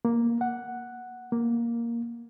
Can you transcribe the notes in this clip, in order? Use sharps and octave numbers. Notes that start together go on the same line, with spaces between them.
A#3
F#5
A#3